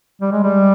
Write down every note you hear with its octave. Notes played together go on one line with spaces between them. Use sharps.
G3
G#3
G3